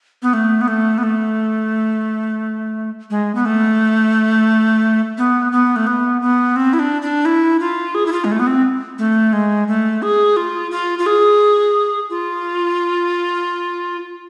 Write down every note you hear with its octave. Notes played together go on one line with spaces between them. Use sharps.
B3
A3
B3
A3
B3
A3
G#3
B3
A3
B3
B3
A3
B3
B3
C4
E4
D4
D4
E4
F4
G#4
E4
F4
G#3
A3
B3
C4
A3
G#3
A3
G#4
F4
F4
F4
G#4
F4